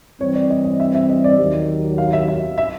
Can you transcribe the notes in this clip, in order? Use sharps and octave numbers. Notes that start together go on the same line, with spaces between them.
E3 G3 C4 C#5
D5
D#5
D#5
E5
E5
D#5
D5
D#2 D#3 F#3
F5
E5
E5
E5